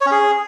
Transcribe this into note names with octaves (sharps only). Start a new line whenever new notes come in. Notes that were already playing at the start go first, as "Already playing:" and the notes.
C#5
C#4
G#4